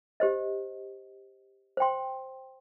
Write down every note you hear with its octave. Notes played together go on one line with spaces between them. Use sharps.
G4 C5 D#5
C5 G5 C6